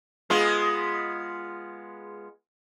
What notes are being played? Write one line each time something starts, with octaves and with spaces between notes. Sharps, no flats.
G#3 B3 F4